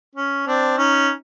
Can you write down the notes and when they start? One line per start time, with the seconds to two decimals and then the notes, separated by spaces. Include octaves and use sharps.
0.16 C#4
0.47 C4 D4
0.78 C#4 D#4